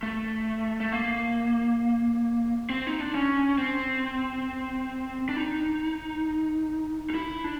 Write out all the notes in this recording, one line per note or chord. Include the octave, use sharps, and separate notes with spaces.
A3
A3
A#3
C4
D#4
D4
C#4
C4
D4
D#4
D#4
E4
D4